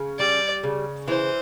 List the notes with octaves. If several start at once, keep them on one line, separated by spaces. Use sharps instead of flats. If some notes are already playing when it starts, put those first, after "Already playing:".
Already playing: C#3
G3 D5
C#3
E3 C5